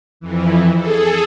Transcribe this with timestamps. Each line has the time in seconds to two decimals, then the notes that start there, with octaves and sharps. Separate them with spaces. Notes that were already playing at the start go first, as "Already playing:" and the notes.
0.20 F2 E3
0.75 G#4 A4